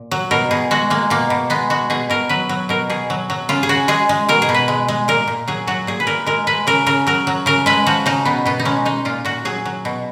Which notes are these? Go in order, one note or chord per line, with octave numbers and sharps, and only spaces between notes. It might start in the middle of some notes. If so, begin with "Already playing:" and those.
Already playing: A#2
F#3
B2 A#4
B2 G#4
G#3 F#4
G#3 A#3
B2 A#3
B2
G#3 B3
G#3 F#4
B2 G#4
B2 A#4
F#3 B4
F#3
B2 A#4
B2 G#4
F#3
F#3
C#3 F4
G#4
C#3 F#4
G#3 G#4
G#3
B2 A#4
G#4
B2
B4
G#3
G#3
A#2 A#4
A#2
F#3 G#4
F#3 F#4
A#2 G#4
B4
A#2 A#4
G#3 A#4
G#3 B4
C#3 A#4
C#3 A#4
F#3 A#4
F#3
C#3 A#4
G#3 B4
F3 F#4
C#3 D#4
B2 B3
B2 B3
D#4
G#3 C#4
G#3 D#4
A#2 F4
A#2 F#4
F#3 G#4
F#3
B2